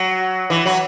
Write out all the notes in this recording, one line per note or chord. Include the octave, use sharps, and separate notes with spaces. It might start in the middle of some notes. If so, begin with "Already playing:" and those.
Already playing: F#3
E3
F#3